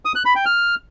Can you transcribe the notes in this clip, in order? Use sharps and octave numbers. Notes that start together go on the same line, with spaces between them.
D#6
F#6
B5
G5
F6